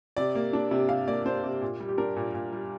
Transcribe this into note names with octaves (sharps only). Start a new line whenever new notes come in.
C3 D5
A#3
D4
C3
C3 F5
A#3 D5
D4 C5
C3
A#2
G3
G4
D4 A#4
A#2
A#2
G3